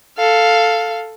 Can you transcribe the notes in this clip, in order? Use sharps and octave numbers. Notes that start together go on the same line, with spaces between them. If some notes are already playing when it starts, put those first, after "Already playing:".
A4 F5